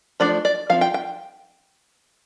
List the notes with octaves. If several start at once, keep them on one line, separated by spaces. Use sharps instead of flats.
F3 A3 D4 D5
D5
F3 C4 F5
G5
G5